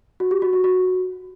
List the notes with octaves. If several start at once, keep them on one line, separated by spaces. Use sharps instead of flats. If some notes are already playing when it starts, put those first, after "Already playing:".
F#4
G4
F#4
F#4
F#4